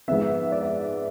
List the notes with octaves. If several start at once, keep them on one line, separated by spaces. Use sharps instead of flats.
G#2 F3 G#3 B3 E5
D5
E5